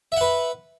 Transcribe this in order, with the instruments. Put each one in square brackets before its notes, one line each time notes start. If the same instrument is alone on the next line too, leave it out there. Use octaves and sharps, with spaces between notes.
[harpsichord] E5
F#5
B4